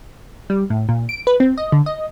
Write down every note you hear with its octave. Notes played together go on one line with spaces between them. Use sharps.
G3
A2
A#2
D7
B4
C4
D#5
D3
D#5